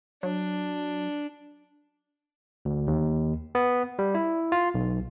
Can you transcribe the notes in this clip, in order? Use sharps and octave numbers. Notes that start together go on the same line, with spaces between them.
F#3 D4
D2
D#2
B3
G3
E4
F4
B1